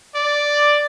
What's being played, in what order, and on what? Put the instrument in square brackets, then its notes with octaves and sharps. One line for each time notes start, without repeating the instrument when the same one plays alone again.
[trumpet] D5